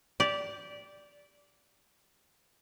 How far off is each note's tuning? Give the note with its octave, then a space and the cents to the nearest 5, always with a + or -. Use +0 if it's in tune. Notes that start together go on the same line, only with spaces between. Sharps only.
G4 +0 D5 -15